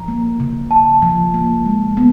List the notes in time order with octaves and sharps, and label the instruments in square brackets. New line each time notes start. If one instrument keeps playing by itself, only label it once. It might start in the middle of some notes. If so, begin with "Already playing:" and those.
Already playing: [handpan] F3 [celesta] A#5
[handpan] A#3
C#3
[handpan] C#3 [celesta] A5
[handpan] F3
A#3
G#3
B3